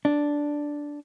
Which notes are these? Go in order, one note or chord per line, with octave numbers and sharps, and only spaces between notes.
D4